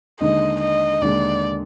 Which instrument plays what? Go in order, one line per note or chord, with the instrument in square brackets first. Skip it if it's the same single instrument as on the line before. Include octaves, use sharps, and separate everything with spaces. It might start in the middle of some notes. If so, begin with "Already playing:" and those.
[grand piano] D#2 D3 G#3 D#4 [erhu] D#5
[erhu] D#5
[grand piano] D#2 D3 G#3 D#4 [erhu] D5